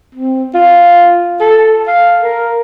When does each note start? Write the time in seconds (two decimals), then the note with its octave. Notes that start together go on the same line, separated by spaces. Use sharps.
0.15 C4
0.54 F4
1.41 A4
1.88 F5
2.23 A#4